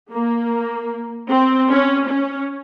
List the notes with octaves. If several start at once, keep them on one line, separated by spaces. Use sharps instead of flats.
A#3
C4
C#4
C#4